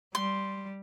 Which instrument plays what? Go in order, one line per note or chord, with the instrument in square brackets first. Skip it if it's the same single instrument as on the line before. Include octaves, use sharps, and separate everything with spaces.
[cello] G3 [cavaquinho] C6